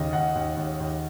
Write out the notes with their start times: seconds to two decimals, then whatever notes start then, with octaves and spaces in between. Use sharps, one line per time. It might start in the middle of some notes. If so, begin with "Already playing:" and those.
Already playing: D#2 C#3 D#5
0.13 D#2 F#5
0.35 D#2
0.57 D#2
0.80 D#2